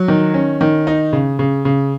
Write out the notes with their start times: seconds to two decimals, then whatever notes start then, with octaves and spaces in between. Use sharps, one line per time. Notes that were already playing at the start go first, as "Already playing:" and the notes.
Already playing: F#3
0.08 D#3
0.34 C#4
0.61 D#3
0.87 D#4
1.13 C#3
1.39 C#3
1.65 C#3